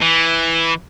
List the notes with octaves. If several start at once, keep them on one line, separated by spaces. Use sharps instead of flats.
E3